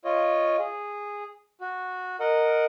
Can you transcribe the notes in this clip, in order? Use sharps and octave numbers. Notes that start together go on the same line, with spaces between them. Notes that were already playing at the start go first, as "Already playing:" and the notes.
F4 C#5 D#5
G#4
F#4
A#4 D#5 F#5